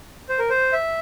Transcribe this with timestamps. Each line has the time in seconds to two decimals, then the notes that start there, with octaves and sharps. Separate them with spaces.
0.29 C5
0.39 A#4
0.50 C5
0.73 E5